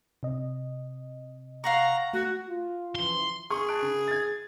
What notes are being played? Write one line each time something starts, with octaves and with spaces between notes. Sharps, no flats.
C3 D#5
F5 F#5 A#5 C#6
A3 F#4
F4
C#3 E3 F3 C6
G#4 C#6
A5 F#6 D7
C#3
G#6 A6